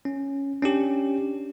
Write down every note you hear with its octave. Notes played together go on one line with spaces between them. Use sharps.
C#4
C#4 D4 G4